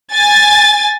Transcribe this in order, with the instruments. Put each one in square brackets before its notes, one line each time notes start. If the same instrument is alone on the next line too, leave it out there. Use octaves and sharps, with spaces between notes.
[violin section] G#5 A6